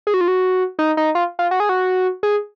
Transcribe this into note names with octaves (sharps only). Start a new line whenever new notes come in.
G#4
F#4
F4
F#4
D#4
D#4
F4
F4
F#4
G#4
F#4
G#4